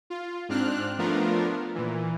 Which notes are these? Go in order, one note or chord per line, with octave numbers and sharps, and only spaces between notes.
F4
G#2 C4 D4 F6 F#6
F3 A3 B3 D4 F4 A#4
A#2 E3